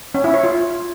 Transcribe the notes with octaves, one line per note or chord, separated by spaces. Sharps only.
C#4
E4
C#5
F4